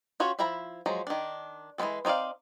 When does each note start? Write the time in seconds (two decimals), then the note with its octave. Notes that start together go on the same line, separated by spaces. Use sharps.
0.20 C#4 F4 F#4 C#5
0.39 F3 E4 E5 A#5 B5
0.86 F3 F#3 G#3 A#5
1.07 D#3 D4
1.78 E3 G#3 A3 C4 A4
2.05 C4 D#4 C#5 D5 F5